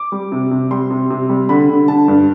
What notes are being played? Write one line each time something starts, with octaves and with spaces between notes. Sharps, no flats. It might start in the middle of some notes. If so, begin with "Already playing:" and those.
Already playing: D6
G3
C3
C3
G3 C6
C3
C3
G3
D3 B5
D3
D3 A5
G2